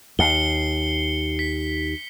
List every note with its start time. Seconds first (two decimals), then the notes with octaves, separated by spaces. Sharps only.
0.19 D#2 C7 C#7 G7
1.39 B6